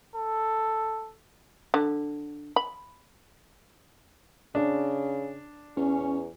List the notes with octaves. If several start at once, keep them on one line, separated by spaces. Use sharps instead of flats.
A4
D3
B5
C#3 D4
E2 C#4